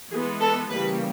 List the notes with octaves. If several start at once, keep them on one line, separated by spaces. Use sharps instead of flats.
E3 G#3 B3 G#4
A4
C#3 E3 G3 A#3 B4